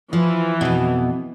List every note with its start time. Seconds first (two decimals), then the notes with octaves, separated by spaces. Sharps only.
0.13 E3 F3
0.61 F2 B2